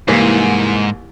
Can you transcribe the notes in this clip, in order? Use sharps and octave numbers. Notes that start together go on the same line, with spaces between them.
C2 G#2 E3 A#3